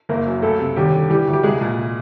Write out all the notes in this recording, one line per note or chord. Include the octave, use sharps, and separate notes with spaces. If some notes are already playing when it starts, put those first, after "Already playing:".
F#1 A#3 A#4
F#2
C#2 A3 A4
C3
D#2 G3 G4
D3
E3 G3 G4
D2
G4
C2 G#3 G#4
A#2